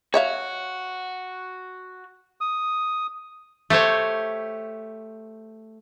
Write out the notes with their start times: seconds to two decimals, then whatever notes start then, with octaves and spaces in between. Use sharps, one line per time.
0.14 F#4 C#5 E5 F5
2.41 D#6
3.70 A3 G4 C5 C#5